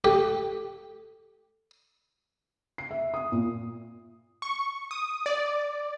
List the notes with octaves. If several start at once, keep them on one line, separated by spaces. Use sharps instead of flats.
G4 A4
C7
E5
D#6
A#2
C#6
D#6
D5